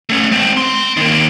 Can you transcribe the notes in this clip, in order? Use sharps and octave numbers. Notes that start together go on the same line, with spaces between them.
A3 C#4
G#3 C4
C4 C6
D#3 A#3